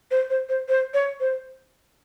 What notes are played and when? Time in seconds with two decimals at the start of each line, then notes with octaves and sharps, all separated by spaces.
0.11 C5
0.30 C5
0.49 C5
0.68 C5
0.94 C#5
1.20 C5